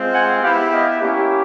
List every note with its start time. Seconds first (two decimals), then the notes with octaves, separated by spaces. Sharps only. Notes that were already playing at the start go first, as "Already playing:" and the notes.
Already playing: G#3 C4 F4
0.14 F#5 G#5
0.43 B3 E4 G4 F5 G5
0.72 D#5 F5
1.01 A#3 C#4 E4 G4